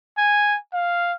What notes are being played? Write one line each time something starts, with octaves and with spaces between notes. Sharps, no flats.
G#5
F5